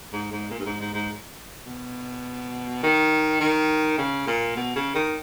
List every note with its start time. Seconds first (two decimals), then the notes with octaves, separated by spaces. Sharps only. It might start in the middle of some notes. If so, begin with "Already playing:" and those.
0.13 G#2
0.32 G#2
0.51 A#2
0.59 G2
0.66 G#2
0.80 G#2
0.94 G#2
1.66 B2
2.83 D#3
3.40 D#3
3.98 C#3
4.27 A#2
4.56 B2
4.76 C#3
4.95 D#3